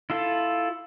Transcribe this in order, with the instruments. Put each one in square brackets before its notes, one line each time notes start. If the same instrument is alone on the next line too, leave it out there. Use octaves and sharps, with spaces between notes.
[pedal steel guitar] E4 F4 A4